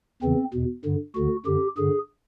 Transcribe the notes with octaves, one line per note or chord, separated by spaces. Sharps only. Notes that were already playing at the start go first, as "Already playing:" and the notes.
E2 C#3 E3 C4
E2 B2
G2 D3
D2 D3 F#4
F#2 D3 G4
G2 D3 G#4